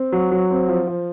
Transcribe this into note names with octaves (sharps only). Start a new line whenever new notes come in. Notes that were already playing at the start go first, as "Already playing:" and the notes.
Already playing: C4
F#3
F#3
C4
F3
F3